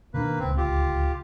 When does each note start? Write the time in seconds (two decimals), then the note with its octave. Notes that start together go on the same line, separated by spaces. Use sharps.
0.14 B2 D#3 A#3 D4 B4
0.39 D1 C#2 C4
0.57 F4 G4